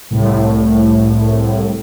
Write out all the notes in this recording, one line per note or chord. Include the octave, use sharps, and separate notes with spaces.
C2 A2